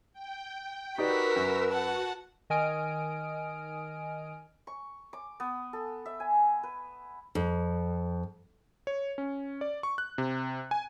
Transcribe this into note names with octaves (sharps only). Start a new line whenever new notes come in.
G5
D#4 F#4 G4 A#4 B4 D5 E6 B6
F#2
F#4 F#5 A5
D#3 D#5 G#5 D#6 F6 D7
C#6
D6
B3
A4
E5
G#5
B4
F2
C#5
C#4
D5
C#6
F#6
C3
G#5